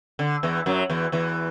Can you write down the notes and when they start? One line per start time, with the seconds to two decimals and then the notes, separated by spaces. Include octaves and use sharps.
0.19 D3
0.43 E2 E3
0.66 F#2 F#3
0.90 E2 E3
1.12 E2 E3